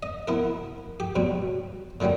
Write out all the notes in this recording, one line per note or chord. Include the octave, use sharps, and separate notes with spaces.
D#5
B3 E4 A#4
G4
G2 B2 F#3
A#2 D3 D#3 F#3 G3